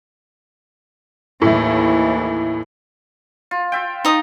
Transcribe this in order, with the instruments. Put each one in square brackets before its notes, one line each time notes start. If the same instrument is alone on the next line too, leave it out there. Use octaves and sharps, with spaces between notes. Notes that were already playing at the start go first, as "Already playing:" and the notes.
[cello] D#2 E3 [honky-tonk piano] A2 E4
[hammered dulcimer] F4
F4 E5 G5
[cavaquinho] D#4 D#6